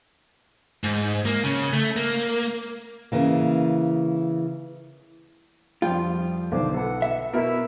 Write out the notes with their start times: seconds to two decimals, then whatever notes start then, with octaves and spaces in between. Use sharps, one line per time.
0.84 G#2
1.26 A#3
1.44 C#3
1.73 A3
1.96 A#3
3.12 C#3 E3 A#3
5.82 F2 F3 G3 F4 G5
6.52 B1 D3 D#3 C5 D6
6.74 A4 B4 F#5
7.02 E5
7.34 B2 E4 A#4 B4